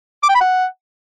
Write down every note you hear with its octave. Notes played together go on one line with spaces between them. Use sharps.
D6
G5
B5
F#5